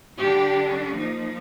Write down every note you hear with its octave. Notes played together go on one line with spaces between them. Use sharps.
D3 G3 D4 G4
F3 A#3 D#4